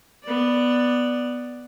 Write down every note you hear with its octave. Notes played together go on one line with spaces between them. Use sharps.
B3 D5